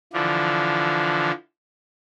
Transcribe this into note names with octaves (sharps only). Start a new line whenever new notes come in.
D3 E3 F3 D4